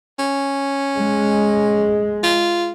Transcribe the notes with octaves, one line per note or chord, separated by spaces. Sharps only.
C#4
G#3
F4